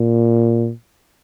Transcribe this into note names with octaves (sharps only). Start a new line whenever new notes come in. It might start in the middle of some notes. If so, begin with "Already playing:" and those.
Already playing: A#2